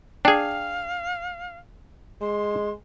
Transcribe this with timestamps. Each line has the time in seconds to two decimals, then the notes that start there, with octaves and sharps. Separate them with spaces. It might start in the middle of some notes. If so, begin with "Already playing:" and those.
0.25 D4 G#4 F5 G5
2.21 G#3 C6